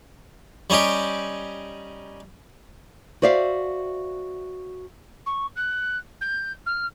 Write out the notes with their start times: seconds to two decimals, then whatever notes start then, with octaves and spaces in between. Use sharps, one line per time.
0.70 G3 C#4 D#4 G4
3.22 F#4 C5 D5 E5 F5
5.26 C#6
5.56 F#6
6.21 G6
6.66 F6